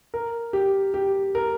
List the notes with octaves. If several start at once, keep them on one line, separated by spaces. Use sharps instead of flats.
A#4
G4
G4
A#4